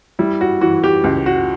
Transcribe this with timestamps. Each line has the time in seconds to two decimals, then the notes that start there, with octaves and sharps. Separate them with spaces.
0.19 G3 E4
0.41 F#4
0.61 E3 F#4
0.84 G4
1.04 C#2
1.26 F#4